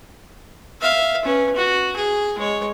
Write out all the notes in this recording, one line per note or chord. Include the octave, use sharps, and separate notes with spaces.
E5 F5
C#4 B4
F#4
G#4
G#3 C#5